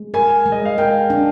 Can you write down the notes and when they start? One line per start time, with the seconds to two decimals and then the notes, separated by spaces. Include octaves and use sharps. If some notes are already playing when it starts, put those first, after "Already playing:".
Already playing: G#3
0.14 A#4 G#5
0.46 G#3
0.52 D#5
0.65 F5
0.78 A#4 G5
1.10 D4